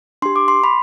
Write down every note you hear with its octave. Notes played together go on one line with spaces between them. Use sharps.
D4 G4 C6
D6
C6
B5